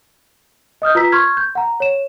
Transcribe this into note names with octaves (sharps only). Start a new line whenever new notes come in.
D#5 D#6 F6 G6
F4 B4 A#5 E6 B6
C6 C#6 F6 G#6
G6
F#5 A#5
C#5 E7